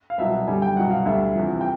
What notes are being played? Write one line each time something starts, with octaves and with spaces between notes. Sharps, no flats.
F5
C2 B2 F#3 E5
F#2 D3 G3 G#5
G5
C2 B2 F#3 F#5
F5
D2 D3 G3 E5
E2 C3 F3
G5